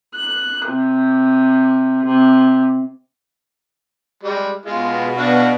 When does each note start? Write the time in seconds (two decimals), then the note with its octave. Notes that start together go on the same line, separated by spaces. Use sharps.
0.15 F#6
0.65 C3
2.05 C3
4.23 G3 G#3
4.65 B2 G#3 F4
5.18 D4 F#4 F5